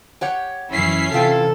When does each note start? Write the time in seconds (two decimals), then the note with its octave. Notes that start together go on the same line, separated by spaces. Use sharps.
0.21 G4 C#5 F#5
0.72 F#2 E3 C#4 E4 B6 C7
1.13 C3 E3 E4 F4 A4 G5